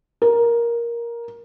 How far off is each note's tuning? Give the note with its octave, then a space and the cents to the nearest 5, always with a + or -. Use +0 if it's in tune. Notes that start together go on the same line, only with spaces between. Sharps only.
A#4 +10